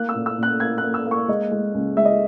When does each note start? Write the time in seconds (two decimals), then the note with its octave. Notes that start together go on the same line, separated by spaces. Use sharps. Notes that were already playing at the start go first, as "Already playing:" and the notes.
Already playing: A#3 F#6
0.09 E6
0.15 A#2
0.26 E6
0.38 A#2 F#6
0.60 A#3 G#6
0.78 A#3 F#6
0.94 E6
1.06 A#3
1.11 C#6
1.28 G#3 D#5
1.52 G#3
1.74 C#2
1.97 G#3 E5
2.05 D#5